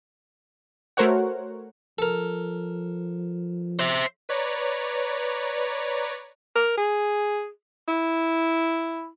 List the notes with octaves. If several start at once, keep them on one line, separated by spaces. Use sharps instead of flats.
A3 F#4 A#4 C5 C#5 F#5
F3 A4 A#4
C5 E5
B4 C#5 D5 A#5
A#4
G#4
E4